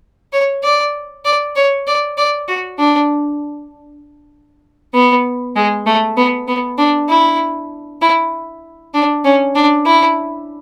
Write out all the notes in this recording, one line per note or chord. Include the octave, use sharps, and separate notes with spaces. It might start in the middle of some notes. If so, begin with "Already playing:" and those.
C#5
D5
D5
C#5
D5
D5
F#4
D4
B3
G#3
A3
B3
B3
D4
E4
E4
D4
C#4
D4
E4